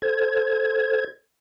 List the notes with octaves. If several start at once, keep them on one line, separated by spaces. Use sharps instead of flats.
A4 C5 G#6